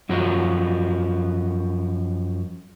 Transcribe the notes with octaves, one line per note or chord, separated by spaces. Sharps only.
F#2 F3 F#4